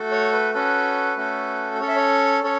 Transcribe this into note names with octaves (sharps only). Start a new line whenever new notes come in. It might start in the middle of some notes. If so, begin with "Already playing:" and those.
Already playing: A3 F#4 A4
C#5
B4
C#4 F#4 A4 B4
A3 C#4 F#4 A4
C#4 A4 C#5
E5
C#5
C#4 A4 C#5